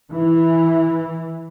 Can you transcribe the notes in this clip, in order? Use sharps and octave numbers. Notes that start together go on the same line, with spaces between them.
E3